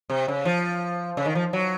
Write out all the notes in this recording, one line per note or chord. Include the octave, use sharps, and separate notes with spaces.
C3
C#3
F3
C#3
D#3
F3
F#3